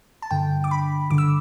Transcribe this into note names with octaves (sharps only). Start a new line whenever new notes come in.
A5
G2 D3 G5
D6
B5
G2 D3 D6
E6